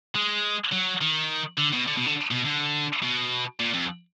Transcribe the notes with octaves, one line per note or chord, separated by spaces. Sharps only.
G#3
F#3
D#3
D3
B2
D3
B2
D3
B2
D3
B2
A#2
F2